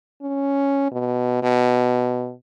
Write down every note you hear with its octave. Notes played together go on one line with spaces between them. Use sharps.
C#4
B2
B2